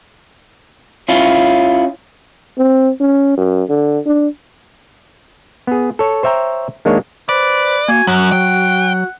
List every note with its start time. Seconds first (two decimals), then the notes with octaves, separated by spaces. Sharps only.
1.09 C#4 E4 F4
2.58 C4
3.00 C#4
3.37 F#2
3.69 D3
4.06 D4
5.67 B3 G#4
5.99 A4 C#5
6.23 C5 C#5 E5 G5 A#5
6.85 D#3 G#3 A#3 D4 C#5
7.29 B4 C5 D5
7.89 A#3 F#4 G#5
8.07 F#2 F#3 F#5
8.32 F#3 G5